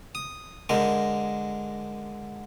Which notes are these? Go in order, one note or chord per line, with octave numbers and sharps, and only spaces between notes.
D#6
D3 G#3 A#4